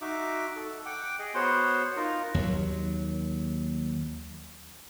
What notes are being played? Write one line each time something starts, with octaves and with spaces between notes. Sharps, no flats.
D#4 F#4 E5 D6
A4
F#5 G5 D6
G#4 D#5
B3 F#4 C5 C#5 F#5 C6
D#4 F4 A#4
D#2 F#3